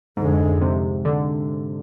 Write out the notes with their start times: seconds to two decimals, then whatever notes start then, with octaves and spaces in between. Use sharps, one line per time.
0.17 F2 G#2 D3 G#3
0.61 C3
1.05 D3